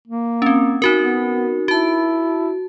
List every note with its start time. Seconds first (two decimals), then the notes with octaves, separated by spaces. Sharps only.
0.07 A#3
0.42 C4 C#4
0.82 D#4 F#4 A#4
0.97 B3
1.68 E4 F#4 A5